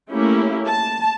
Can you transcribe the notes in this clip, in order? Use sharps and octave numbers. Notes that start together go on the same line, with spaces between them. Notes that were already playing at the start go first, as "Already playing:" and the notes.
A3 A#3 C#4 E4 G4
A5